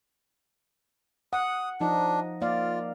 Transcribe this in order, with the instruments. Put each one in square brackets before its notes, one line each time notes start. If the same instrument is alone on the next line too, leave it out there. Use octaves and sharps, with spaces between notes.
[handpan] F#5 [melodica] D#6
[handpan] F3 D#4 D#5 [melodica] D4
[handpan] A#3 D5 F5 [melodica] F4